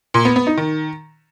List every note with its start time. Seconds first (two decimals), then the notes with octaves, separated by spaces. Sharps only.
0.14 A#2
0.25 B3
0.36 B3
0.47 D#4
0.57 D#3